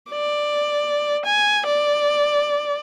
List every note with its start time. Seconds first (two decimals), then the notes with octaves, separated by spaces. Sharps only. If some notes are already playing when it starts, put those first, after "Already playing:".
0.10 D5
1.25 G#5
1.67 D5